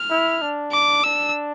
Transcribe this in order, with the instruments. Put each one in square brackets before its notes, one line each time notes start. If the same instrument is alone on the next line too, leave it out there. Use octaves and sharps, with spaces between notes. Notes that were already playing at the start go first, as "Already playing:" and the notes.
Already playing: [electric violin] F6
[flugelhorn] E4
D4
[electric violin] D6
[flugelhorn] D4 [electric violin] E6